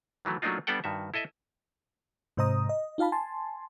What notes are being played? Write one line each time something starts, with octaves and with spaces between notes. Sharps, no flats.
D#3 E3 F#3 A3
F#3 A3 A#3 D4 D#4 F4
G3 B3 D4 A4 F#5 G5
G2 D#3 F#4 E5
E4 A4 D#5 E5
G#2 C3 C5 D#5 A#5 D#6
D#5
D#4 F4 F5 A5 B5
G#5 A5 C6